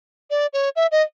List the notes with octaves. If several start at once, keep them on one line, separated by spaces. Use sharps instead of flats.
D5
C#5
E5
D#5